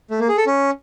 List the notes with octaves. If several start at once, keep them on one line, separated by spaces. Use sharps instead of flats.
A3
A#3
G#4
A4
C#4